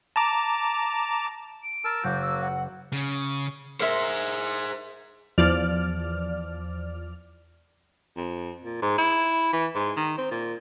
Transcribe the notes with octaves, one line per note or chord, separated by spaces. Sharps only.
A5 A#5 D6
D7
A#4 A5 E6
F#1 F#3 A#3 F#4 G6
E6
F#5
C#3
G#4 A#4 C5 E5 C6
E2 F3 D5 F6
F2
A#2
G#2
E4
E3
G#2
D#3
C4
A#2